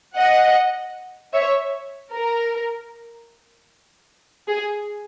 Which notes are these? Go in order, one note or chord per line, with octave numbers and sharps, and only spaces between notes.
D#5 F#5
C#5 E5
A#4
G#4